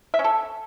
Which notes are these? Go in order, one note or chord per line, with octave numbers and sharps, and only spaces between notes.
E5
C#4
A4